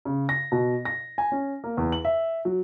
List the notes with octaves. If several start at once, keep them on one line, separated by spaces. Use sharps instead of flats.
C#3
A#6
B2
A#6
G#5
C#4
A#3
E2
F#7
E5
F#3